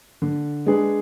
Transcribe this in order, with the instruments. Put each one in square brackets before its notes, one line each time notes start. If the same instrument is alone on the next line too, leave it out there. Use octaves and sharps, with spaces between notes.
[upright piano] D3
G#3 D4 G#4 B4